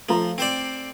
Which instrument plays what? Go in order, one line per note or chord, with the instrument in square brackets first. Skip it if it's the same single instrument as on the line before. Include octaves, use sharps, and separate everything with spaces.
[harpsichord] F3 [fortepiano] A3 F4 A#5
[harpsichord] C4 C5 D5